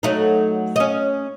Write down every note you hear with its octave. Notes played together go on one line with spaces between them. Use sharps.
F#3 A3 D#4
C#4 D#5